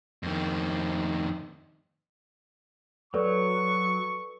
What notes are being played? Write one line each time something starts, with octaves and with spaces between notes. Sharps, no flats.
F2 D#3
F#3 A4 B4 D5 C#6